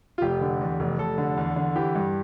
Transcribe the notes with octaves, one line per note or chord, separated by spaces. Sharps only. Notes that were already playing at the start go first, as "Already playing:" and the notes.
F4
F1 G4
D3
E2
F1
F1 A4
D3
E2
D3
E3 G4
G2